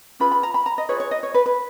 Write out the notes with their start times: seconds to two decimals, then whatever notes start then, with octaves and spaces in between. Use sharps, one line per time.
0.19 C#4 F4 G#4 B4 B5
0.32 B5
0.43 A#5
0.54 B5
0.66 A#5
0.78 D#5
0.89 F4 G#4 B4 C#5
1.00 C#5
1.11 D#5
1.23 C#5
1.34 B4
1.46 B4